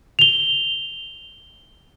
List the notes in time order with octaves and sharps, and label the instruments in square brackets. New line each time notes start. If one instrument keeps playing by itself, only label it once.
[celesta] F7 G7